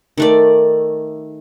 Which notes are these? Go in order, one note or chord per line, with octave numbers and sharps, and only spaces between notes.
D#3 A3 D5